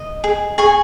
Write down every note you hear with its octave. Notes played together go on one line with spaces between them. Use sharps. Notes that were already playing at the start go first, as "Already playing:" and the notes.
Already playing: D#5
G#4
G#4 G#5 C#6